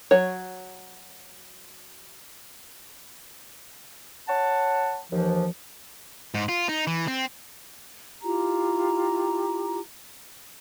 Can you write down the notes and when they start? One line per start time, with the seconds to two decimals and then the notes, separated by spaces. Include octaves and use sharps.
0.11 F#3 C#5
4.28 C#5 F#5 A5
5.11 D#2 E3 F3
6.34 G#2
6.49 F4
6.69 D#4
6.87 E3
7.08 C4
8.23 E4 F4 G4 A#5